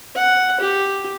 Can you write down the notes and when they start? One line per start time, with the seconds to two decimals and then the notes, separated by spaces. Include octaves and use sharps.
0.15 F#5
0.60 G4